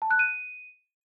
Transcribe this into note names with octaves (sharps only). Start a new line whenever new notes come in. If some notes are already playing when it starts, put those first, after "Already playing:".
A5
F#6
D#7